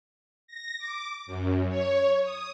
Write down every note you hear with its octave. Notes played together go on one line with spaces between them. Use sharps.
A#6
D6
F#2
C#5
D#6